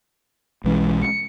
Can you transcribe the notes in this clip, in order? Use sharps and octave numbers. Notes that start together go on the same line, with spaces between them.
B1 E3 G#3 C#4
C#7